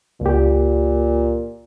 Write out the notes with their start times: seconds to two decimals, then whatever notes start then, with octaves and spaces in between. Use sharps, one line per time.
0.21 C#2 A#2 G4